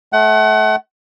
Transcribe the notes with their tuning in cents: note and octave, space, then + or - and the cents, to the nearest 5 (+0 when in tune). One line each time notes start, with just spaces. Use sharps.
A3 -30 F#5 +25